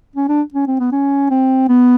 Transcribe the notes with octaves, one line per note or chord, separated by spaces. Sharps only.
C#4
D4
C#4
C4
B3
C#4
C4
B3